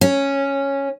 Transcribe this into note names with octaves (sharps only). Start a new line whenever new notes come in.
C#4